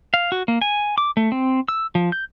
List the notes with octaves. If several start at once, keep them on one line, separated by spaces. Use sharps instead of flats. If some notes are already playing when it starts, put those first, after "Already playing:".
F5
F#4
A#3
G#5
D6
A3
C4
E6
F3
G6